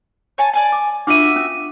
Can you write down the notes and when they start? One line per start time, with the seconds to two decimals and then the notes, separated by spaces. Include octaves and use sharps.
0.38 C#5 G#5 A5
0.54 D5 G#5 A5
0.72 D6
1.07 A#3 D4 F4 F#4 E5 F5 D6 D#7
1.36 C#4 D#6